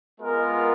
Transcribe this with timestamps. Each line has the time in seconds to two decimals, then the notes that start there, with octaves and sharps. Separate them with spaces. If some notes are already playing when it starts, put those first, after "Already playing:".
0.19 G#3 B3 F4 A#4